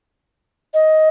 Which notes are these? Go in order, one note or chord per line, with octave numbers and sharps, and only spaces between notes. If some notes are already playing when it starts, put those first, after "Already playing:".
D#5